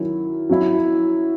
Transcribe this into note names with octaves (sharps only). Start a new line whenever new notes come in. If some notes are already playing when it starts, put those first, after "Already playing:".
Already playing: D#3 F#3 C#4 E4
F#3 C#4 E4